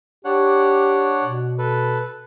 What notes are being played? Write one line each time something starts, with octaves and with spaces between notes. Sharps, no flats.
D4 G4 C#5 F#5
B2
A4 B4